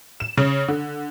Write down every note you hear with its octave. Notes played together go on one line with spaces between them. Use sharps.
E7
C#3
D3